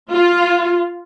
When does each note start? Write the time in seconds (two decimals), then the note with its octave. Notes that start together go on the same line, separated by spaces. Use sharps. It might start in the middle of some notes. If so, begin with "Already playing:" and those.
0.12 F4